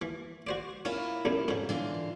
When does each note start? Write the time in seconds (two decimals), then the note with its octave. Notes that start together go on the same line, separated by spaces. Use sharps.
0.02 E3
0.47 F#4 C5 D5
0.85 A#3 C#4 E4 F4
1.25 B1 F#2 C#3
1.48 F2 G#2 C#3
1.69 D3 E3 F4